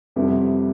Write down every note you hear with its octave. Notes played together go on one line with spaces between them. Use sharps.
F2 C3 G3 B3 E4